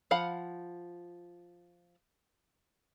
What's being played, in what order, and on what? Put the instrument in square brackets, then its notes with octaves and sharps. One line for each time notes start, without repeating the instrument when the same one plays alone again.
[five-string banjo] F3 F5 F#5 B5